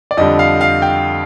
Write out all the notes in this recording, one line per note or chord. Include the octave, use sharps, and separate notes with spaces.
D5
F2 D3 G3 D#5
F5
F5
G5